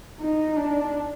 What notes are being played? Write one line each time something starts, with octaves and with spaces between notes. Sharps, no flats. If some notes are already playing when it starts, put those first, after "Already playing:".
D#4
D4